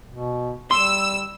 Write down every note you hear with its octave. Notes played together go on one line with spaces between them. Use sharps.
B2
G3 C6 E6